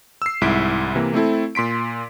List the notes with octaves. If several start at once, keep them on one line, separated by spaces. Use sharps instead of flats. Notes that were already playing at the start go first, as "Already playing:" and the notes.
E6 C7
C2 G#2 E4 B6 D7
C3 E3 A#3
A3 C4 E4 A4
A#2 C6 B6 D7